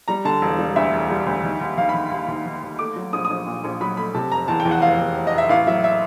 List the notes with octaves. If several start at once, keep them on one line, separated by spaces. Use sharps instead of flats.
G3 A#5
D3 A5
E1
G3
D2 E5
E1
G3
D2
D#3
D#2
D#3 F5
D#3 B5
D#2
D#2
D#3
D#2
A3 D6
F#3
A#1 D#6
D#6
A#1
A#2
A#1
F#3 B5
A3 B5
C3 A5
F1 A#5
E2 A5
G5
E2
F#5
F1 F5
E2
F1
D#5
F1
E5
A1 F5
F#3 E5
E5